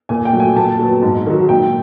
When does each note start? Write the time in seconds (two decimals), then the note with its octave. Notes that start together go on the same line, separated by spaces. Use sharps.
0.09 A#2 G#5
0.25 G5
0.33 F#3 A3
0.40 G#5
0.56 A#2 A5
0.79 F#3 B3
1.02 G#2
1.26 D#3 F#3
1.49 A#2 G5